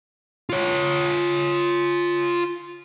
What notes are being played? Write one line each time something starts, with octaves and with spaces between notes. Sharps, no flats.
F4 C#5